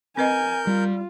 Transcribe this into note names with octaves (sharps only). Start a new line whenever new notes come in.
C4 A#4 B4 D#5 G#5 G6
G3 F4